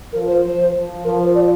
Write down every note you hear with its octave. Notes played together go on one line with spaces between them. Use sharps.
F3 A#4
C5
F3 C5
F3
F3 A#4
C5
D5